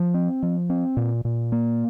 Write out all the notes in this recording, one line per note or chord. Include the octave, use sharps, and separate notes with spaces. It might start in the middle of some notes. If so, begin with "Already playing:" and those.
Already playing: F3
C4
F3
C4
A#2
A#2
A#3